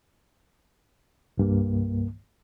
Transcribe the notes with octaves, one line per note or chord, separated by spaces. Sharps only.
C2 G2 A#3